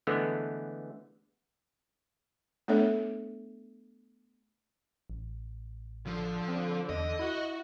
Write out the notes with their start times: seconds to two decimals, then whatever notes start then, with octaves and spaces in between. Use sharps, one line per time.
0.07 D3 E3 G#3 A3 B3
2.68 A3 B3 D4 A4 C#5 E5
5.10 A1
6.06 D3 F3
6.48 C4
6.89 E2 D#5
7.19 E4 F#4